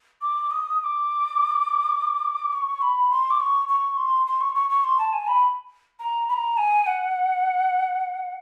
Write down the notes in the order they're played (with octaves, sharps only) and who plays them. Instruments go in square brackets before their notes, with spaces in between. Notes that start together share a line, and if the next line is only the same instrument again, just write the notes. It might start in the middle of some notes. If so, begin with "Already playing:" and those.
[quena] D6
D#6
D#6
D6
C#6
B5
C6
D6
C#6
C#6
C6
C6
C#6
C#6
C#6
C6
A5
G#5
B5
A#5
B5
A#5
G#5
F#5